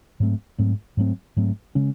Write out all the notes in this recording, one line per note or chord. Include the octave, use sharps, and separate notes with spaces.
G#2 F#3 A3 C4
G#2 F#3 A3 C4
G#2 F#3 A3 C4
G#2 F#3 A3 C4
C#3 G#3 C#4